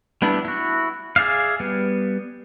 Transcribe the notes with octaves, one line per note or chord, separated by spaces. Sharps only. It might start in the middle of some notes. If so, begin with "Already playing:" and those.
G3 B3 D4 E4
E4 F#4
G#4 D5 E5 F5
G3 B3